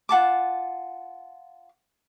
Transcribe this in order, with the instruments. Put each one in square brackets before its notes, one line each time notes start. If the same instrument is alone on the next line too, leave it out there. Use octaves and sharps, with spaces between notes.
[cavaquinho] F4 F#5 A5 D6